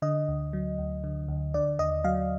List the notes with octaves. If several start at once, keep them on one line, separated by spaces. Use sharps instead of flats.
D3 D#5
D2
F#3
D2
D3
D2
D3 D5
D#2 D#5
F#3 F5